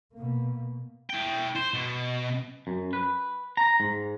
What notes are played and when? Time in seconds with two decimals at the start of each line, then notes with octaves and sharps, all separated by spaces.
0.14 B2 A#3
1.10 E4 G5
1.56 C5
1.74 B2
2.67 F#2
2.93 B4
3.57 A#5
3.80 G#2